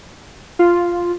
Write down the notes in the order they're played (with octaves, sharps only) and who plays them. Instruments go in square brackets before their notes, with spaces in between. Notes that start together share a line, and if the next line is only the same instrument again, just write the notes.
[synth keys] F4